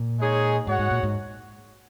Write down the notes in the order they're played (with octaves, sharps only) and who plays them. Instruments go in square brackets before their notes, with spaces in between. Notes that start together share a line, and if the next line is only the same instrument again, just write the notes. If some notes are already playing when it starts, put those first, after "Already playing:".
Already playing: [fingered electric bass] A#2
[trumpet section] G#3 D#4 G#4 C#5
[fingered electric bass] G#2 [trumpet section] F#4 C#5 F#5
[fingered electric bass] G#2
A#2
G#2